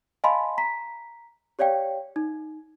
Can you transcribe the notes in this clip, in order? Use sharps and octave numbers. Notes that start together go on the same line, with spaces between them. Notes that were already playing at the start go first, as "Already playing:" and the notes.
D#5 F5 G#5 A5 B5 C6
A#5 B6
G4 C#5 D5 F5 G5
D#4